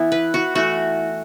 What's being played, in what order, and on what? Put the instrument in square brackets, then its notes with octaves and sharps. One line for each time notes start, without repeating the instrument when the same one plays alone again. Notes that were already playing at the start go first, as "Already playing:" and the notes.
Already playing: [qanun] E3 B3 E4
B4
F#4
E3 A3 F#4